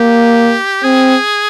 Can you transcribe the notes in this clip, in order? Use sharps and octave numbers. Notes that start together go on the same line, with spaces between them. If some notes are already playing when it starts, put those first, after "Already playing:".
Already playing: A#3 G4
C4 G#4